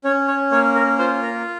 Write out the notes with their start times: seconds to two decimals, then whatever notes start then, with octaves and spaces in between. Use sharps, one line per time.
0.04 C#4 C#5
0.28 C#5
0.51 A#3 C#5
0.75 A#4
0.99 F4 C5
1.22 A#4